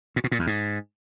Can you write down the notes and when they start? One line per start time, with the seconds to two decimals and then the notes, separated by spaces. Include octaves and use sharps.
0.16 A#2
0.24 B2
0.32 A#2
0.39 E2
0.47 G#2